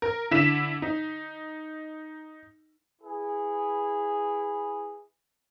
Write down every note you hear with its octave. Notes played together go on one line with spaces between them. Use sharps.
A#4
D3 E4 B6 E7
D#4
E4 G#4 B4